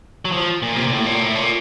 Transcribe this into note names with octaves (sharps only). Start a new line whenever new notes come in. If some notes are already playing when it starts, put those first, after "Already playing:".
F#3
F3
A#2
C3
A#2
A2
A#2
A2
A#2